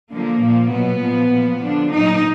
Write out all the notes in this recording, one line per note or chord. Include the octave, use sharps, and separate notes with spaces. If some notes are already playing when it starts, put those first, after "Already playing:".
D3 F3 A#3
A#2 F3
B2 F#3 B3
A#2 F3
A#2 F3
D3 F3 D4
A#2 F#3 D#4